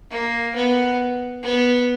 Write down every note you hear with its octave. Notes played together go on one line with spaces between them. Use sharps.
A#3
B3
B3